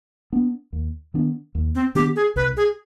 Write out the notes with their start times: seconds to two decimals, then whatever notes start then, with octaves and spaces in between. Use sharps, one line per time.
0.33 B3 D4
0.73 D#2
1.14 D#3 B3 D4
1.55 D#2
1.75 C4
1.95 D#3 B3 D4 G4
2.16 G#4
2.36 C2 B4
2.57 G#4